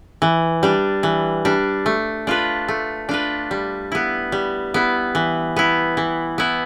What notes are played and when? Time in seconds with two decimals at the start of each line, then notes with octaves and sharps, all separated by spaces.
0.22 E3
0.63 G3 D4
1.03 E3
1.45 G3 D4
1.86 A3
2.27 D4 F4 B4
2.68 A3
3.09 D4 F4 B4
3.51 G3
3.92 B3 E4
4.32 G3
4.74 B3 E4
5.15 E3
5.56 B3 E4
5.97 E3
6.38 B3 E4